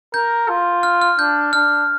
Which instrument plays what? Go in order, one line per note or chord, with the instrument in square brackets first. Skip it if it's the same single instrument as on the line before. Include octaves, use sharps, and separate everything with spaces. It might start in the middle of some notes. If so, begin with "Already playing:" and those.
[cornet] A#4 [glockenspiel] G6
[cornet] F4
[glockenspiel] F6
F6
[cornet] D4 [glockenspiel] G6
[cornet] D4 [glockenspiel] F6